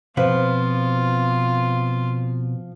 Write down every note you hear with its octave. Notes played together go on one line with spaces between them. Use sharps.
B2 F3 C4 F4 B4